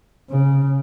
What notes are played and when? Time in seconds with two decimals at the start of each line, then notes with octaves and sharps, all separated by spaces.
0.31 C#3